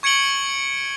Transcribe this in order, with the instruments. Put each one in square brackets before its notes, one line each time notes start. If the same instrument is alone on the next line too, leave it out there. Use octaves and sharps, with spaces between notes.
[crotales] C#6 G#6 C#7 D7 F#7 G7